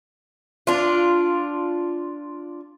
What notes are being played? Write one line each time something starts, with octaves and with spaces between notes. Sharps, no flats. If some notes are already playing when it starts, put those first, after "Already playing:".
D4 F4